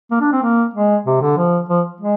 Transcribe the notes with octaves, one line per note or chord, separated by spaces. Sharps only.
A#3
D4
C4
A#3
G#3
C3
D3
F3
F3
G#3